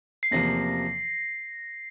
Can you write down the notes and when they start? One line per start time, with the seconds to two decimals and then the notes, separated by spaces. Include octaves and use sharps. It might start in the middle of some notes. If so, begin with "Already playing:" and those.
0.23 C7
0.31 E2 C3 F3 A#3 A#6